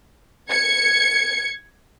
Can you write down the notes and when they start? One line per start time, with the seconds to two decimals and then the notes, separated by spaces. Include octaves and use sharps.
0.49 G#6 C#7